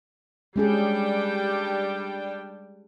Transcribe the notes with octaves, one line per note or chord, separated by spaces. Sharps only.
G3 G#3 C#4 D4 G#4 G5